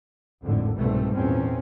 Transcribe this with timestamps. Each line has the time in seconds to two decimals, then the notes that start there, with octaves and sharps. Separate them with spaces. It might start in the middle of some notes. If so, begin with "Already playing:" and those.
0.43 G#1 F2 A2 D3
0.76 C2 G#2 B2 G3 A3 C4
1.14 E2 A#2 C4 C#4